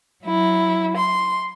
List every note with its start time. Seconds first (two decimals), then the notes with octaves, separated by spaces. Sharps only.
0.24 F#3 E4
0.97 C6